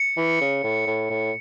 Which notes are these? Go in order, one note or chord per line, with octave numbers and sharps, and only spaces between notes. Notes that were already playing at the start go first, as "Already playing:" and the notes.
Already playing: C#7
E3
C#3
A2
A2
A2